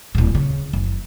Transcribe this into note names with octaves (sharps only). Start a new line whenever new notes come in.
D1 A#2
C#3
F#1